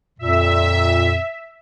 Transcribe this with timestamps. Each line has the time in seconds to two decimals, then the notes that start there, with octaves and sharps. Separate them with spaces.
0.19 F2 A#2 E5